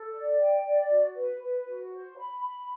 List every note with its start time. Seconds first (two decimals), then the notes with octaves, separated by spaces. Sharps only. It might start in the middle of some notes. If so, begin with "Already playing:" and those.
Already playing: A4
0.13 D5
0.39 G5
0.64 D5
0.89 F#4
1.15 B4
1.41 B4
1.66 F#4
1.91 C5
2.17 B5
2.43 B5